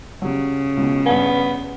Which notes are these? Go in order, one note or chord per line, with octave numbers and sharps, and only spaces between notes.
C#3 F#3 G3
C#2 B2
G2 B3 G#5